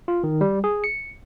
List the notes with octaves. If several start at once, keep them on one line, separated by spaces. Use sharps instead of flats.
F4
D#3
G3
G#4
C#7